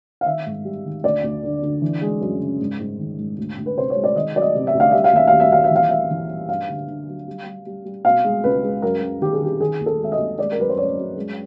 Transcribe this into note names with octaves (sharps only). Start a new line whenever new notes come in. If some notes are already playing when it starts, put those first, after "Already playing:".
F5
D#3 E5
G#2
G3
D#3
D2 D5
D2
D3
D3
E3
G#3
F#2
C#3
G#2
G#2
D#3
G#2
D2
D2
B4
C3 C5
C#5
G#3
D5
D#3 D#5
F#3 D5
D#5
C3
E5
D2
F5
G3 E5
F5
D#2 E5
D#2 F5
E5
D#2 F5
E5
E3
F5
G3 E5
E3
G3
G2 F5
D3
D3
F#3
G3
G3
G3
G3
B2 F5
G#3
C#2 B4
G#3
F#2 A#4
F#2
D#3 G4
G#4
D#3 G4
D#3 G#4
D#2
A4
G#3 E5
D#5
D#2
G#3 D5
A#4
F#2 B4
C5
F#2 C#5
F#2
G#3